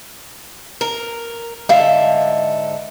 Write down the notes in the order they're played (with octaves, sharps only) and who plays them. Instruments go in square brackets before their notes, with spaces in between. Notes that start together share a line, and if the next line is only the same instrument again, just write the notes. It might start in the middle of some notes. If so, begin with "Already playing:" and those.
[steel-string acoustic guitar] A#4
[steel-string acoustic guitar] G#2 D3 E5 [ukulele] F5